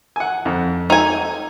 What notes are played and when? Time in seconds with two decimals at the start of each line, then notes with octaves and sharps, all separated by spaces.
0.16 F#5 G#5
0.45 F2
0.90 D#4 A4 G#5